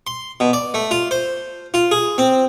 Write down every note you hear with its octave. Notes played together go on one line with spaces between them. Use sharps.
C6
B2
D5
A3
F4
C5
F4
G#4
C4